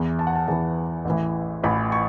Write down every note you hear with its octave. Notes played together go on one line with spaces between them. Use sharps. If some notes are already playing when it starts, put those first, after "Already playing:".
Already playing: E2 E3 B3
A5
F#5
A5
E2 E3 B3 A5
A1 A2 E3
A1 A2 E3 B5
C#6